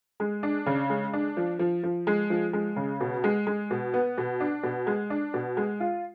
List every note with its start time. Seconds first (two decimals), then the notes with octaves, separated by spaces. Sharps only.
0.20 G#3
0.43 D4
0.66 C#3
0.90 G#3
1.13 D4
1.37 F3
1.59 F3
1.83 F3
2.07 G#3
2.30 F3
2.53 G#3
2.76 C#3
3.00 B2
3.24 G#3
3.47 G#3
3.71 B2
3.94 B3
4.18 B2
4.40 D4
4.63 B2
4.87 G#3
5.10 D4
5.34 B2
5.57 G#3
5.80 F4